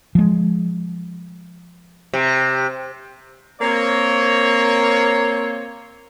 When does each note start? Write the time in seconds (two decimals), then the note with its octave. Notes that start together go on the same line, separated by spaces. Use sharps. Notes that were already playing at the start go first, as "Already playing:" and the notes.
0.15 F3 G#3
2.14 C3
3.61 A#3 C4 C#5